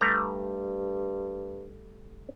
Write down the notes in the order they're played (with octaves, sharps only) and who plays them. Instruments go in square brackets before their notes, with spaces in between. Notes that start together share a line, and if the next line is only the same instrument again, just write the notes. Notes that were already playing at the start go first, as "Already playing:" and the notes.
[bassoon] G2 [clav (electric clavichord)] G3 A3 A#5